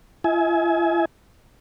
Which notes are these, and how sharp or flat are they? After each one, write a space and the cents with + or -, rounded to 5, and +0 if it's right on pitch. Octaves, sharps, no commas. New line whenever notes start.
F4 -45 E5 -45 G#5 +20